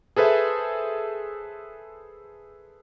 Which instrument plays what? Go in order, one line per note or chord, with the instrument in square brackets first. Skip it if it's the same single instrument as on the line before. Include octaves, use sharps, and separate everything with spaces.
[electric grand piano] G#4 A4 B4 C5 E5